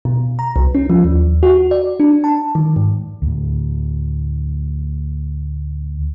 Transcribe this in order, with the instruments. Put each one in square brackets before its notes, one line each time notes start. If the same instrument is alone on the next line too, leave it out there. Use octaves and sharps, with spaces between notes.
[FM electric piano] B2
A#5
C2
C#4
F3
D#2
F#4
D5
D4
A5
D#3
G#2
[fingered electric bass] D2 A2